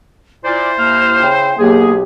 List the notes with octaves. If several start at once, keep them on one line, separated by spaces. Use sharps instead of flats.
A#2 E4 C5 D5
D#2 A#3 F6
C#3 E4 G5
B1 F#3 A#3 G4 G#4